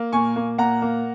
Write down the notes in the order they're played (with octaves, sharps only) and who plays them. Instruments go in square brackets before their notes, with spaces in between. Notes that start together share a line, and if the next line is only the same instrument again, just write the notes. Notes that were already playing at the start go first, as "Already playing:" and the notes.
Already playing: [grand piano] A#3
A#2 G#5 C#6
A#3
A#2 F#5 A#5
A#3